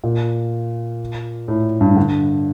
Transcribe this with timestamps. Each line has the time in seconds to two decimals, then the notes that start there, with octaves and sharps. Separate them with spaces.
0.04 A#2
1.48 A2
1.81 G2
1.97 D3